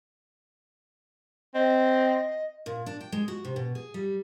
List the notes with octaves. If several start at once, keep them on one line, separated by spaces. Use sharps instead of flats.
C4 D#5
A#2
D4
G5
G#3
F#4
C3
B2
G#4
G3